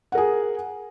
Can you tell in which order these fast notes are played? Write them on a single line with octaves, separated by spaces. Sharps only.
F#5 A#4 G#4